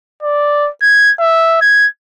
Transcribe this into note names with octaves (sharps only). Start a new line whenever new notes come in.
D5
G#6
E5
G#6